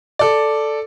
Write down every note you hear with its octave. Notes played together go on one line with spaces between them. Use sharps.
A4 D5